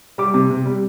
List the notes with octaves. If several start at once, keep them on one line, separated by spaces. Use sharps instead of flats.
G3 D6
C3
C3
G3